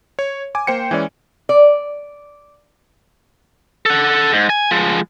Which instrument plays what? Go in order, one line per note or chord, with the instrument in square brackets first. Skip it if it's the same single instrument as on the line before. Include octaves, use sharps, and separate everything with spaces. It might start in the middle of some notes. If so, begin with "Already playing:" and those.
[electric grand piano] C#5
G#5 D6
A#3 C5 G5 C#7
E3 G#3 C#4 D5
[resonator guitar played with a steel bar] D5
[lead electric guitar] A4 F#5
G#2
G#5
F3 G#3